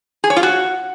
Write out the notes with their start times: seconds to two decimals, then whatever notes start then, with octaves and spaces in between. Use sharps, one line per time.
0.24 G#4
0.30 C#5
0.36 F4
0.43 F#4